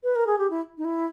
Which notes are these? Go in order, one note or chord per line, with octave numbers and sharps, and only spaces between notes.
B4
A#4
G#4
G4
E4
D#4
E4